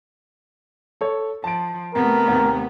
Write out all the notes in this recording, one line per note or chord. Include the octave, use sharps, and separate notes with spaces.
A4 C#5
F3 A5 D7
C3 A3 B3 A#4
D#2 C3